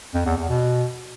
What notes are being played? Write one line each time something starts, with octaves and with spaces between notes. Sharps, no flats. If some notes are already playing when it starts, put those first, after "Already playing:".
F2
E2
E2
B2